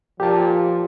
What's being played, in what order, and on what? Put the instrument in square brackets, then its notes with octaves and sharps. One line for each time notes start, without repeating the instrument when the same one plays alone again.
[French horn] A#2 [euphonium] F3 [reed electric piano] G4 A5